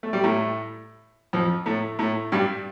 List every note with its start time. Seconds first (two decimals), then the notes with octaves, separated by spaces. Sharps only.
0.03 A3
0.13 G3
0.24 A2 A3
1.33 F2 F3
1.66 A2 A3
1.99 A2 A3
2.32 G2 G3